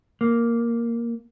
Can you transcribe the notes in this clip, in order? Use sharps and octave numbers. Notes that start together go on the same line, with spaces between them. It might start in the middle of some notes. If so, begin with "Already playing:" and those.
A#3